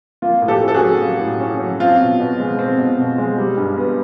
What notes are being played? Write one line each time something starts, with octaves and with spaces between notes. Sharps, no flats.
A#3 F4
A2
G4 A4
C#4
A4
F#4 G#4
F#3
A#3
A2
C#4
F#3
C4 F4
B2
B2
G#3
C4
B2
B2
G#3
G3
G2
B3